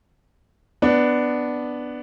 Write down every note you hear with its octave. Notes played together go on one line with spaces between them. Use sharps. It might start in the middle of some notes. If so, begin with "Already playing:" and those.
B3 D4